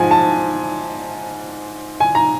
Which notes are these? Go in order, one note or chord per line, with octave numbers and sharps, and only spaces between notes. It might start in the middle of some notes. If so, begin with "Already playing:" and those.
Already playing: G#2 F3 G#5
A5
G#5
A#5